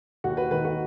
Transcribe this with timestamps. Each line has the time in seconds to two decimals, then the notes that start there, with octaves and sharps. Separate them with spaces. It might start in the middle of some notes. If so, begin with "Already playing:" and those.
0.24 D#2 F#4
0.37 B4
0.51 D#3 B4
0.65 F#4